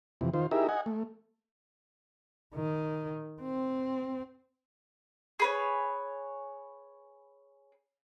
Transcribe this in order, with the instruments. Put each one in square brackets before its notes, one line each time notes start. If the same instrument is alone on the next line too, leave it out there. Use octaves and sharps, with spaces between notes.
[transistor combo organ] F2 C3 E3
D#3 F4 C5
D#4 E4 G4 G#4 A#4 E5
D#5 F#5 G#5
A3
[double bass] D#3
C4
[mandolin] G#4 B4 C#5